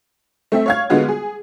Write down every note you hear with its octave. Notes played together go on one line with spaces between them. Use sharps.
A3 C4 E5
C#5 F5 G#6
D3 G#3 B3 F4 F#4
G#4